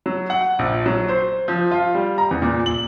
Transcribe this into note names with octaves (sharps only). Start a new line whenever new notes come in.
F#3
F#5
A#1
F#3
C5
F3
F4
G3
A#5
E2
A#2
F#7